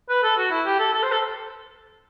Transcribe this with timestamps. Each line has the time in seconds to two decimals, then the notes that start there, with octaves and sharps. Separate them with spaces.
0.09 B4
0.23 A4
0.37 F#4
0.51 E4
0.65 G4
0.79 A4
0.93 A4
1.03 C5
1.12 A4